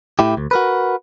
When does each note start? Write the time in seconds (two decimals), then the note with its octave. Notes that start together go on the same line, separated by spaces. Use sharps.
0.19 A2 E4 G4
0.37 D2
0.51 F#4 A#4 B4